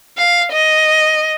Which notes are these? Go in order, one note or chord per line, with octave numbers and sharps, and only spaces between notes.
F5
D#5